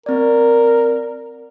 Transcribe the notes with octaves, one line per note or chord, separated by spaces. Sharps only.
C4 A#4 D5